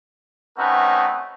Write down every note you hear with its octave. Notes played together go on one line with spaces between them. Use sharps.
A3 C4 C#4 D#4 F#4 B4